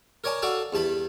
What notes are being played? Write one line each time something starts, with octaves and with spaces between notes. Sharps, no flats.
A#4 C#5 D5 G#5 A5
F#4 A4 D5 F5 A5
E2 G2 A5 B5